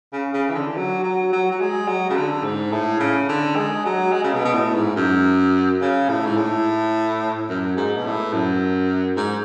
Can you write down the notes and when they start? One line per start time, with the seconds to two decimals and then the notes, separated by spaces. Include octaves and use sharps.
0.13 C#3
0.34 C#3
0.50 E3
0.54 D3
0.77 F#3
1.03 F#3
1.33 F#3
1.51 F#3
1.61 G#3
1.88 F#3
2.10 C#3
2.17 D3
2.44 G#2
2.72 A2
3.00 C#3
3.29 D3
3.56 G#3
3.85 F#3
4.12 G#3
4.24 C#3
4.33 B2
4.45 B2
4.54 A2
4.76 G#2
4.96 F#2
5.81 C#3
6.09 A2
6.26 G#2
6.37 A2
7.49 F#2
7.77 G#2
7.97 B2
8.05 A2
8.33 F#2
9.17 G#2